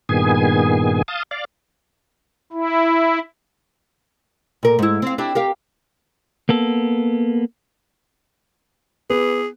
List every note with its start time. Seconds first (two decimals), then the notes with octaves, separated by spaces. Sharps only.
0.09 G2 A#2 D#3 B3 G#4 G#5
1.08 F5 A5 D#6
1.31 D5 F5
2.53 E4
4.63 A#2 A#4
4.79 G#2 E4
5.02 C4 F5
5.18 D4 E4 G4
5.35 G4 A#4 F5
6.49 A#3 B3 A4
9.10 B3 G#4